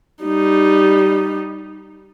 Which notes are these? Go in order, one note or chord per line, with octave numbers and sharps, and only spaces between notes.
G3 D#4